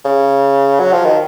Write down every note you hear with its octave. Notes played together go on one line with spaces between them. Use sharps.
C#3
F#3
F3
D#3